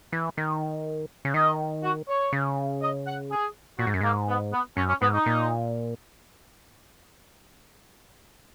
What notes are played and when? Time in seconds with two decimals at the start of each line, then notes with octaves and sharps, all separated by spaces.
0.12 E3
0.37 D#3
1.25 C#3
1.34 D#3 D#5
1.83 F#4
2.08 C#5
2.32 C#3
2.82 D#5
3.06 F#5
3.30 G#4
3.79 A#2 F#4
3.87 G#2
3.94 F#2
4.01 G#2 A#3
4.28 B3
4.52 B3
4.77 F#2 C#4
4.89 C#4
5.02 G#2 B3
5.14 D#4
5.26 A#2